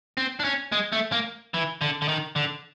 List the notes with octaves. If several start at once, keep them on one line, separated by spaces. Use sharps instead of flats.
C4
D4
C#4
G#3
A3
A#3
E3
D3
D3
D#3
D3